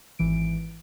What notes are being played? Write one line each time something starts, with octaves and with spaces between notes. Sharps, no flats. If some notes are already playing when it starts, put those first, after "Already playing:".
G#1 E3 D7